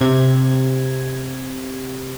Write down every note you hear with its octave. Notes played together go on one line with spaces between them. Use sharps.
C3 G#6